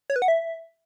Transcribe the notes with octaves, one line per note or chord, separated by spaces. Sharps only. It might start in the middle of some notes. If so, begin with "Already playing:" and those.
C#5
B4
F#5
E5